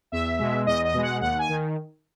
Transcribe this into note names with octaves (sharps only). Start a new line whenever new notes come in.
E2 E5
B2 G#3
E2 D#5
D#5
B2 G#3
F#5
D#2 F#5
G#5
D#3